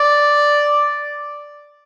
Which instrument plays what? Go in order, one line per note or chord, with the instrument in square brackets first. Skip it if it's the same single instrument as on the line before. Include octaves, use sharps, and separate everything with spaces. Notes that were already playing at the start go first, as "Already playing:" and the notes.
Already playing: [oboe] D5